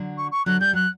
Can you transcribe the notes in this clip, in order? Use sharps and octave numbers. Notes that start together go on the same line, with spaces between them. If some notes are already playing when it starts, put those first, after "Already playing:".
Already playing: D3 F#3
C#6
C#6
D3 F#3 F#6
G3 G6
F#3 F#6